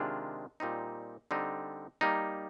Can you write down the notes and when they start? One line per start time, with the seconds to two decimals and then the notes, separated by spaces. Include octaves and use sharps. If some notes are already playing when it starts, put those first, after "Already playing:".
Already playing: C3 D#3 G#3 D4 F4
0.60 A#2 G3 C4 D#4
1.31 D3 G3 C4 D#4
2.01 G3 A#3 D#4